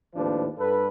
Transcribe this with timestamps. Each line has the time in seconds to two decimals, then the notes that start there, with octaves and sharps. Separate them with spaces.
0.15 G#1 D#2 A2 F3 D4 B4
0.59 G2 A4 B4